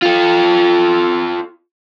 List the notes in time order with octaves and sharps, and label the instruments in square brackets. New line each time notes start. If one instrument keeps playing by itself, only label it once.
[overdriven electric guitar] F4 A4